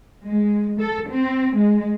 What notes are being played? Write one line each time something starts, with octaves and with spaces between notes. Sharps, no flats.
G#3
A4
C4
G#3